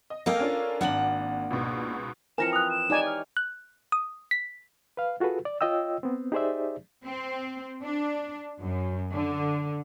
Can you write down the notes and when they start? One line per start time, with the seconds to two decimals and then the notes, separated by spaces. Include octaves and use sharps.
0.10 D#5
0.26 A#3 A4 A#4 D#5 F5 G5
0.40 C#4 D4 F4
0.81 G#1 A#3 D4 F#5 F#7
1.50 C#2 G#2 B2
2.38 E3 F3 C4 A#4 G#5 A#6 C#7 E7
2.53 D#6 F#6 F7
2.70 E7
2.90 D#4 G4 C#5 D5 G#5
3.07 F6
3.37 F#6
3.92 D#6
4.31 B6
4.97 B4 F5
5.20 F4 F#4 G#4 A4 B4
5.45 D5
5.61 F4 C#5 D#5 G5 E6
6.03 B3 C4
6.32 D#4 G4 G#4 C5 D5 E5
7.06 C4
7.83 D4
8.61 F#2
9.14 D3